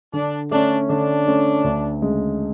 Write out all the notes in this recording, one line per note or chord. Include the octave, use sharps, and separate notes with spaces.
D3 D4
A3 C#4 D4
D3 D4
A3 C#4
D2
C#3 G#3